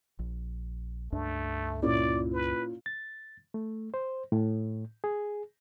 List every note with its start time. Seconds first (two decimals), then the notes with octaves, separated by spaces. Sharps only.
0.19 A#1
1.12 C#2 G2 A3 D4
1.82 A#2 C#4 E4 D5
2.33 B4
2.86 A6
3.54 A3
3.94 C5
4.32 A2
5.04 G#4